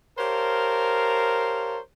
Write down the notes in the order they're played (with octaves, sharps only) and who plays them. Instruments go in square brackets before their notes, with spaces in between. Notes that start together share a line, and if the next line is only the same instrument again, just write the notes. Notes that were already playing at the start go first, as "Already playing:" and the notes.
[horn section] G4 A#4 C5 C#5 F5 A5